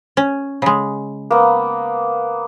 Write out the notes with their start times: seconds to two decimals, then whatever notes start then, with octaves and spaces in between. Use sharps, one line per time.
0.17 C#4
0.62 C#3 G#3
1.31 A#3 B3